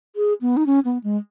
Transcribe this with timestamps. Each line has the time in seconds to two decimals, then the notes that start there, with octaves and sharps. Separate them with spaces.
0.16 G#4
0.41 B3
0.57 D#4
0.66 C#4
0.85 B3
1.04 G#3